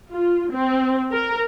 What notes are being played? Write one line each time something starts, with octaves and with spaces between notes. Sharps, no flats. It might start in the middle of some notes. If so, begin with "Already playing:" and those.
F4
C4
A#4